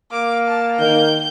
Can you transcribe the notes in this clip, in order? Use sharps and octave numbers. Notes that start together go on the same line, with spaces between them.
A#3 D6
A5
D#3 G6